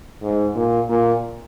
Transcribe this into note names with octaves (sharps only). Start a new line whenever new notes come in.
G#2
A#2
A#2